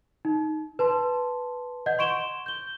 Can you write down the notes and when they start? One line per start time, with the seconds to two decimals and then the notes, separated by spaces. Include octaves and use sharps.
0.25 D#4
0.79 B4 A5 C6
1.86 D#5 F#5 G6
1.99 C6 C#6 D7 E7 G7
2.46 G6 G7